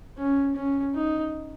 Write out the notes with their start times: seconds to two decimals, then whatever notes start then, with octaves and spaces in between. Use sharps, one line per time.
0.18 C#4
0.55 C#4
0.94 D#4